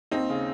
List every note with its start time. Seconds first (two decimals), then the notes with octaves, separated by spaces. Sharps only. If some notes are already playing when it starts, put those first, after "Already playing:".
0.11 D#2 C4 D#4
0.29 C#3